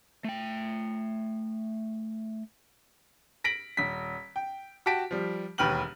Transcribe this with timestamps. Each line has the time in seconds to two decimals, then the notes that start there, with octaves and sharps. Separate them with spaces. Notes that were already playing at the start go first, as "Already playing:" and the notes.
0.24 A3 G5
3.44 A#6 B6 D7 F#7
3.77 D#1 B6
4.36 G5
4.86 F#4 G4 A5 B6 D7
5.11 F3 G3
5.58 E1 D#2 B4 G5 F6 F#7